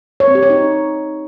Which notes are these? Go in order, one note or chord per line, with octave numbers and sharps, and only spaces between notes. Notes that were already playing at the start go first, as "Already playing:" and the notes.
C#5
C4
G4
C#5
D#4